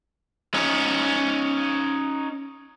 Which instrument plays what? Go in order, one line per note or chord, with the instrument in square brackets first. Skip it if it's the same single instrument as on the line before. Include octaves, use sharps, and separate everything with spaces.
[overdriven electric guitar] C#4 D#4